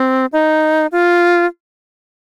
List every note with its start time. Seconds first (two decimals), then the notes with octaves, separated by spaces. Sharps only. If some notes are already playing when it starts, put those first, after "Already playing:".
Already playing: C4
0.33 D#4
0.92 F4